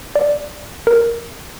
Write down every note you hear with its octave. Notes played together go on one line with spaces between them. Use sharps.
D5
A#4